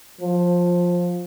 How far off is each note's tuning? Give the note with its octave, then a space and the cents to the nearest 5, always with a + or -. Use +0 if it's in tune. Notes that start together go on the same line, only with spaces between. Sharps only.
F3 +15